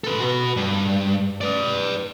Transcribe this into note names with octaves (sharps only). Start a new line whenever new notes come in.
A4 B4
F#4 B4
G2
B4 D5